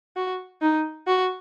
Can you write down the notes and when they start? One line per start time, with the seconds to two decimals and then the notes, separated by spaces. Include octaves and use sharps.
0.16 F#4
0.61 D#4
1.07 F#4